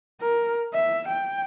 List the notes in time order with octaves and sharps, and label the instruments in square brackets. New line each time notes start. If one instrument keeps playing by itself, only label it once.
[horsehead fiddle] A#4
E5
G5